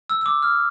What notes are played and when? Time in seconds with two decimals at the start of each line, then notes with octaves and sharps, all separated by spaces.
0.10 E6
0.21 E6
0.26 D6
0.42 F6